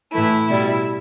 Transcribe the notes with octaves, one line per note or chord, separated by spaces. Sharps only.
A2 E3 A3 E4
B2 G3